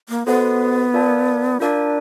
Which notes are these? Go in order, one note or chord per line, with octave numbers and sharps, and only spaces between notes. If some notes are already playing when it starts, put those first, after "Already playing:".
A#3
B3 F#4 A4 C5 D#5 F#5
F4 A#4 D5 F5 A5
D4 F4 A#4 D5 F5 A5